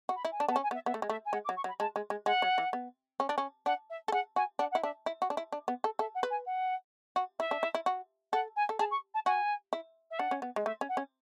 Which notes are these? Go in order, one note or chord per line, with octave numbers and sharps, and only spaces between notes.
F#4
B5
E4
G#5
D4 A5
B3
A5
C#4
G#5
B3
E5
B3 E5
A3
G#3
A3 E5
G#5
G#3 F#5
D6
F#3
C#6
F#3
B5
G#3 A5
G#3
G#3
G#3 F#5
F#3
E3
B3
C#4
D4
C#4
D4 F#5
E5
A4
G#4 F#5
F#4 G#5
D4 F#5
F#5
E4
D4 E5
E4
F#4
D4
E4
D4
B3
A4
A4 E5
F#5
B4
G#5
F#5
F#4
E4 E5
D4
E4
E4
F#4
A4 F#5
G#5
A4
G#4 A5
C#6
A5
F#4 G#5
E4
E5
D4 F#5
C#4
B3
G#3
A3 E5
C#4
F#5
C#4